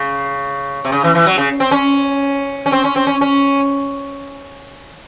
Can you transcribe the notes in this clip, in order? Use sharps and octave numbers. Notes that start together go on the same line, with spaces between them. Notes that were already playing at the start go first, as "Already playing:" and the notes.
Already playing: C#3
C3
C#3
E3
E3
F#3
C#3
C4
C#4
C#4
C4
C#4
C4
C#4
C#4